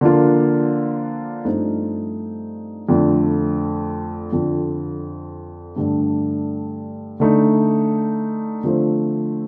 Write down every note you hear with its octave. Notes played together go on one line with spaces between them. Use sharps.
D3 F3 A#3 D4 F4
G2 F3 A3 C4 D#4
F2 D3 A3
F2 D3 F3
G2 D3 A3 D4
D3 A3 D#4
D3 F3 A3 C4